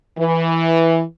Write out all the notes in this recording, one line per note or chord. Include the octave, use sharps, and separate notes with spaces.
E3